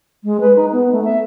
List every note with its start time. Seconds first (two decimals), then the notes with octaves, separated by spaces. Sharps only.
0.24 G#3
0.41 B4
0.56 D#4
0.72 B3
0.92 A3
1.04 E5